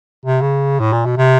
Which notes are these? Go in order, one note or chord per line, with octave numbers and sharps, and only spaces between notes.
C3
C#3
A2
A#2
B2
C3